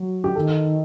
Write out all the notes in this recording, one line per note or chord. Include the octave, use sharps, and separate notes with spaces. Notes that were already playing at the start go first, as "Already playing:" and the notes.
Already playing: F#3
G4
D#3 A4